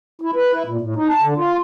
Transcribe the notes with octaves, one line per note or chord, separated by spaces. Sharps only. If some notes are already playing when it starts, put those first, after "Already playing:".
E4
B4
E4
A#2
A2
D#4
A5
D3
F4